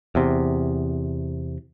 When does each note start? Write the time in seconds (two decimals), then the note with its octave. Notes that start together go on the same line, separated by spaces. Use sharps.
0.15 E2 C3